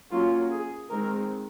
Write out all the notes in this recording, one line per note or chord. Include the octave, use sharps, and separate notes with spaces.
F#3 A#3 C#4 F4
G#4
D#3 G#3 C4 A#4